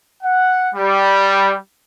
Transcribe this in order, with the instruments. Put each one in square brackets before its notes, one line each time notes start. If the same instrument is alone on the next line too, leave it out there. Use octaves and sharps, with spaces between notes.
[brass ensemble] F#5
G3